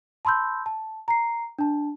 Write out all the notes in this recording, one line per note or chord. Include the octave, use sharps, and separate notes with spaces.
A5 B5 C6 E6 G6
A5
A#5 C7
D4 A5